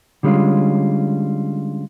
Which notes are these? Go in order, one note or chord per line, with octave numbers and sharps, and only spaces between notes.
D3 G3 G#3 C#4 F4